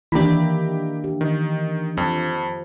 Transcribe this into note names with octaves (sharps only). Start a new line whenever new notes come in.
D#3 E3 A#3 D4 E4 G4 A#5 B5
G4
D#3
F2 F3